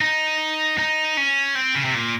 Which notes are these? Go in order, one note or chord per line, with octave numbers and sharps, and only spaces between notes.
D#4
D#4
C#4
C4
C#3
C3
A#2